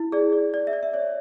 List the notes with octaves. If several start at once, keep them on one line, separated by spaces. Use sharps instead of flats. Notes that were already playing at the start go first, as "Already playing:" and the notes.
Already playing: E4
G#4 D5
D5
D5
E5
D5
E5
C#5 D5